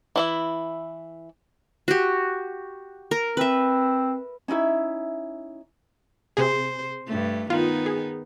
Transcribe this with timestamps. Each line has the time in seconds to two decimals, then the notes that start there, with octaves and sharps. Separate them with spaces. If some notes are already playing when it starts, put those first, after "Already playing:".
0.16 E3 E4 E5
1.88 F#4 G4
3.11 A#4
3.37 C4 B4 E5
4.48 C#4 D#4 E4 E5
6.37 C3 G#4 C5
7.06 G2 A3
7.50 D#3 B3 D#4 F4
7.86 G#4